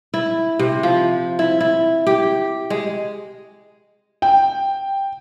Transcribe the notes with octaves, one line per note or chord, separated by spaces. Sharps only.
E4
C3
F3
E4
E4
G4
G#3
G5